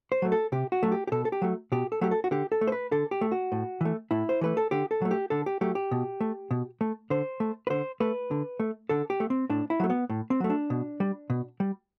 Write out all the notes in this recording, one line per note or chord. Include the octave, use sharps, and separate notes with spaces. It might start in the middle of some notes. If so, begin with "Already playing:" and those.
C5
F#3 A3
A4
C3 G4
F#4
F#3 A3
G4
G4
B2 A4
A4
G4
F#3 A3
B2 G4
A4
F#3 A3 G4
A4
F#4
D3 G4
A4
A3
C5
B4
D3 A4
G4
A3
F#4
A2
E3 A3
A2 E4
C5
E3 A3 B4
A4
D3 G4
A4
F#3 A3
G4
D3 A4
G4
F#3 A3 G4
G4
B2
A3
B2
A3
D3 C5
A3
B4
D3 C5
A3 B4
D3
A3
D3 A4
G4
A3
C4
A2 D4
E4
F#3 A3
B3
A2
C4
F#3 A3
D4
B2
G3
B2
G3